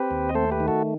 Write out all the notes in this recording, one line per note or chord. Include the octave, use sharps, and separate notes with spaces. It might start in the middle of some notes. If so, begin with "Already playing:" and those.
Already playing: C4 G4 B4
D#2
D#5
A3 A4 C5
G4 B4
D#3
F#4 A4